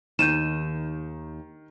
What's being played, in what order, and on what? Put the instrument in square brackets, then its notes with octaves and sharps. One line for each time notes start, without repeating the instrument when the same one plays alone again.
[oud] D#2 [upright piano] D#3 [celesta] G6 D#7 E7